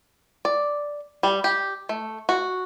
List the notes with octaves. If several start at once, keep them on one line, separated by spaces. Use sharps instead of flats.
D5
G3
G4
A3
F#4